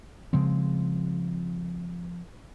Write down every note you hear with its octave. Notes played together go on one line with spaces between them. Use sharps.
C#3 F3 G#3 C4